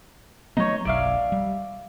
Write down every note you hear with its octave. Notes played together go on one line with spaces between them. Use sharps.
F#3 A3 B3 D#4 C#5
F#1 B1 D5 E5 F5
G3